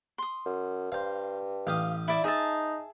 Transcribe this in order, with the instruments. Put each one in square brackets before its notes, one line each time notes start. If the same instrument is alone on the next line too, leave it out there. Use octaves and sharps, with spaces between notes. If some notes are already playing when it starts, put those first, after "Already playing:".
[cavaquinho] C6 D#6
[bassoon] F#2
[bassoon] G2 [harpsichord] C5 F5
[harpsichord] A1 G4 D#6 [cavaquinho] F5
[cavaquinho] E4 D5 E5
[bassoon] D#4 [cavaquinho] G#4 E5 A5 [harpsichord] D#6